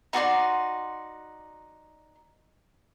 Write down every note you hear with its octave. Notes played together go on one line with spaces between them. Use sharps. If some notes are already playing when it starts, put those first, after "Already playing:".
D#4 F#4 D5 C6